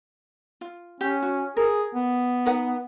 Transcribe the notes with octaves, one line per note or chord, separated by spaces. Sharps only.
F4
C#4 G4
F#4
G#4 A#4
B3
D#4 B4 F#5